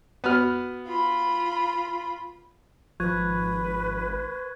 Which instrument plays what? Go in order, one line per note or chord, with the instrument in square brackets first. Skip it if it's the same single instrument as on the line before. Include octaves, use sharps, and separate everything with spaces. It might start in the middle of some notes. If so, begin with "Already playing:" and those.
[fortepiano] B3 F#4 F6
[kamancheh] F4 B5
[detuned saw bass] G#1 [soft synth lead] F3 [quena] B4 [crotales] C#6 F#6 G#6